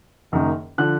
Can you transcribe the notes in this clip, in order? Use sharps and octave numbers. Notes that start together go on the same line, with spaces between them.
F#1 F#2 D#3 A#3 D#4
D3 F3 F#6